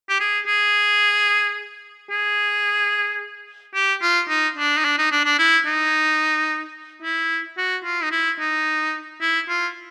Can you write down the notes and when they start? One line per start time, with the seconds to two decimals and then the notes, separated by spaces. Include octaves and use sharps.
0.09 G4
0.20 G#4
0.47 G#4
2.11 G#4
3.75 G4
4.02 F4
4.29 D#4
4.57 D4
4.78 D#4
4.85 D4
4.98 D#4
5.12 D4
5.25 D4
5.38 E4
5.66 D#4
7.02 E4
7.58 F#4
7.84 F4
8.03 D#4
8.11 E4
8.39 D#4
9.21 E4
9.48 F4